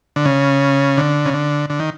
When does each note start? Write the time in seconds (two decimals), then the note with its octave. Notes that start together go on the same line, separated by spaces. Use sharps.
0.16 D3
0.25 C#3
0.97 D3
1.25 C#3
1.34 D3
1.70 D3
1.80 D#3